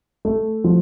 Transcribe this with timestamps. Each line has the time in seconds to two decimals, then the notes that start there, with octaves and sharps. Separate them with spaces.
0.25 A3
0.64 F3